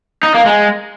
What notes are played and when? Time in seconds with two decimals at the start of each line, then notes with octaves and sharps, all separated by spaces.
0.23 D#4
0.34 A#3
0.46 G#3